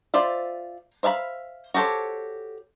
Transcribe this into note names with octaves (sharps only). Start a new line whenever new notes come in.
F4 C5 D5 E5
C5 E5 F5 A5 B5
F#4 G4 A4 C5 C#5